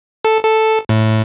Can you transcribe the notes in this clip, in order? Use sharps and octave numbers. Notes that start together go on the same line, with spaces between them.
A4
A4
A2